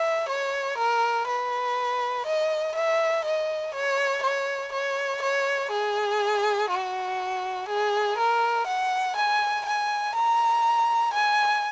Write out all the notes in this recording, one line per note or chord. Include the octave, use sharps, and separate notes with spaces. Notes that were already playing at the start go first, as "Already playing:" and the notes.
Already playing: E5
C#5
A#4
B4
D#5
E5
D#5
C#5
C#5
C#5
C#5
G#4
F#4
G#4
A#4
F#5
G#5
G#5
A#5
G#5